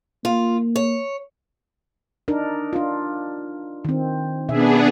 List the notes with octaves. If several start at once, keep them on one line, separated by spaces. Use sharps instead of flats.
A#3 F4
C#5
D4 D#4 A#4
D4 F4
D#3 C4
B2 B3 D4 G#4 E5